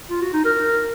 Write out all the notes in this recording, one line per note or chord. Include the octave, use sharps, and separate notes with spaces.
F4
F#4
D#4
A#4